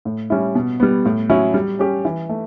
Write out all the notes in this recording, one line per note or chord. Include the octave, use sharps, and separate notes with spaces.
A2
G3 C#4 E4
B2
G3 B3
A2
F#3 C#4 E4
G3
C#4 G4
E3
A3